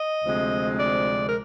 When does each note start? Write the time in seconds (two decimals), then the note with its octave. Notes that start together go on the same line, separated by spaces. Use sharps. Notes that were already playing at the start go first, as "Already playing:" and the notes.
Already playing: D#5
0.23 D2 C3 F3 G#3 C4
0.79 D5
1.28 A#4